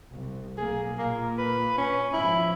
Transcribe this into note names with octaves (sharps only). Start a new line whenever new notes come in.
C2
B1 A#3 G#4
A#2 A#3
B4
C#4
G#1 F3 E4